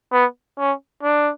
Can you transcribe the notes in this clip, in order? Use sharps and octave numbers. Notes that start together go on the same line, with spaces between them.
B3
C#4
D4